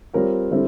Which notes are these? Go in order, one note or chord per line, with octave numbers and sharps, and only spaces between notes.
G3 C4 F4 A#4 C#5
D3 G3 C4 E4